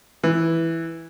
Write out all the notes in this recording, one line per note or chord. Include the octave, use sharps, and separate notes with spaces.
E3